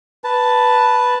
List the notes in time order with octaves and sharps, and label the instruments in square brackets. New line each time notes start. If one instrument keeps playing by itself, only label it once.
[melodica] B4 A5